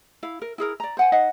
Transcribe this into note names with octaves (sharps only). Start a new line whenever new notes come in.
E4 F5
A#4
E4 G#4 A#4
D5 A#5
C5 F#5 G#5
D#4 D#5 F#5